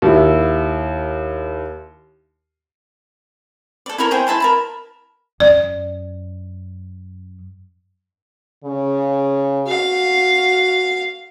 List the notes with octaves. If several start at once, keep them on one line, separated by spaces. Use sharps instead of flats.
D#2 E4
A4 D5
E4 A4 A#4 C#5
E4 G#4 C5 G5
E4 E5 A5 C6
A#4 A5 B5
F#2 D5
C#3
F#4 F5